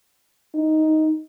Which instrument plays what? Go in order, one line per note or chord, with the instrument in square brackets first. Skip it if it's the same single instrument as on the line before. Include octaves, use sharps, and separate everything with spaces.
[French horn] D#4